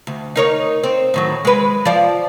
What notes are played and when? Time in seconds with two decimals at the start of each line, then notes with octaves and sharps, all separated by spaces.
0.07 D2
0.36 D#4 A#4 C#5
0.84 C4
1.14 A2 D#3 F#3
1.45 G#3 B4
1.85 F3 D5